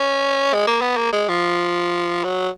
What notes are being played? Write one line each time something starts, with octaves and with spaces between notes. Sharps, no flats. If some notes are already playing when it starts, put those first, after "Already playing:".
Already playing: C#4
G#3
A#3
B3
A#3
G#3
F3
F#3